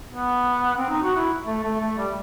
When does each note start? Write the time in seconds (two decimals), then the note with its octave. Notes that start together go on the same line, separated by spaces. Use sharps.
0.09 B3
0.78 C4
0.90 D#4
1.03 F#4
1.16 E4
1.46 A3
1.64 A3
1.80 A3
1.98 G3